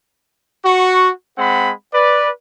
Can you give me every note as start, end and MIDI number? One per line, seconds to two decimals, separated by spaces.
0.64 1.10 66
0.64 1.10 85
1.38 1.71 56
1.38 1.71 60
1.38 1.71 78
1.38 1.71 83
1.93 2.29 71
1.93 2.29 74